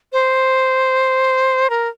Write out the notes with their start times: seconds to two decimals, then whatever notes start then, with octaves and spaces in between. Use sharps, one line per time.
0.13 C5
1.70 A#4